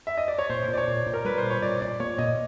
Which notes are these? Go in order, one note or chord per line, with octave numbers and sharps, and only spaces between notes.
E5
D#5
D5
C#5
A#2 C5
A#2
D5
C#5
A#2
A#2
A#4
G3 B4
C5
A#2
C#5
A#2 D5
A#2 D5
A#3 C#5
A#2 D#5